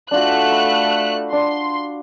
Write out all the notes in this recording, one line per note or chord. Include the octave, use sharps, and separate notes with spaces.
A3 D4 F4 F#4 F#6
B5
D4 C6